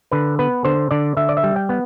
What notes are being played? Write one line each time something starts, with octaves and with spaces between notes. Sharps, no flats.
D3 B4
B3 B4
D3 C5
D3 D5
D3 E5
D5
E5
G3
G5
B3